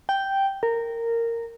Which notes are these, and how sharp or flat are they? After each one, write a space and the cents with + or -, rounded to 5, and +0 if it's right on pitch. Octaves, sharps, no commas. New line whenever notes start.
G5 -5
A#4 -15